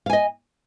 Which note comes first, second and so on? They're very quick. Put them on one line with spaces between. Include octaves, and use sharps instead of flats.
F5 G#5 D#5